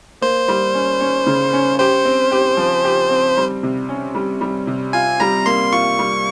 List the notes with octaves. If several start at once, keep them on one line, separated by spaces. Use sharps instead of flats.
A#3 C5
G3
C#4
C#4
C#3
C#4
G4 C5
C4
G4
F3
G4
C4
G3
C3
C#4
G3
G3
C3
F4 G#5
G3 A#5
A#3 C6
F4 C#6
G3